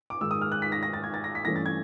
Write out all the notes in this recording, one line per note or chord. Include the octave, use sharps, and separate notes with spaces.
D6
G#2 D#3 G#3 E6
D#6
F6
F#6
B6
A#6
A#6
A6
G#6
A6
A#6
B6
G2 E3 A3 C#4 A#6
A6
G#6